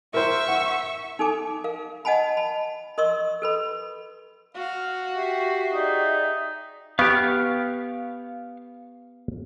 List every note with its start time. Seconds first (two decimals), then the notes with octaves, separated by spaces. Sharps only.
0.14 A#4 C5 E5 C#6
0.48 F#5
1.19 D#4 A4 G#5 D6
1.64 A#4 F5
2.05 D#5 F#5 G#5 A5 B5
2.37 A5 B5
2.98 A#4 D#5 C6 C#6 E6
3.42 A4 B4 B5
4.55 F#4 F5
5.15 G4 E5 F5 C#6
5.74 D#4 G#4 D5 E5
6.99 B3 G4 F5 C#6 F6